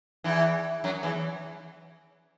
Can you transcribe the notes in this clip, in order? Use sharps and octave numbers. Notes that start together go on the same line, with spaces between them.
E2 E3
F#2 F#3
E2 E3